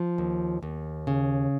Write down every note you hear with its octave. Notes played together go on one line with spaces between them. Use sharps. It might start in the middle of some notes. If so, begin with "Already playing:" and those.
Already playing: F3
D#2
D#2
C#3